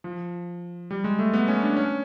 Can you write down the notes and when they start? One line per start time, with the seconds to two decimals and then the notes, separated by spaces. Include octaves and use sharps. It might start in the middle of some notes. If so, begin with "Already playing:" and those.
0.04 F3
0.91 G3
1.04 G#3
1.19 A3
1.33 B3
1.48 C#4
1.62 D4
1.77 C#4